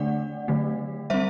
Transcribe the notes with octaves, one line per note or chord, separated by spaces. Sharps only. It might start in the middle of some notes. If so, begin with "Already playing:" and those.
Already playing: D3 A3 D4 D5 F#5
D3 F#3 A3
G3 C4 C5 E5